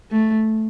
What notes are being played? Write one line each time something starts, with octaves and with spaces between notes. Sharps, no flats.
A3